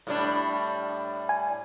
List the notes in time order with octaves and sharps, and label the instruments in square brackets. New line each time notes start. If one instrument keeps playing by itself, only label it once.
[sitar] A2 G3 D4
[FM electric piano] G#5